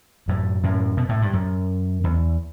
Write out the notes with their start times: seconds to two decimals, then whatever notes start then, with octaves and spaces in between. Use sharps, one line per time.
0.28 F#2 A2
0.63 F#2 A2
0.97 B2
1.09 A2
1.22 G2
1.33 F#2
2.04 E2